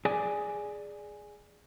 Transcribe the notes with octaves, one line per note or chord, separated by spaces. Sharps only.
G#4 D5 G#5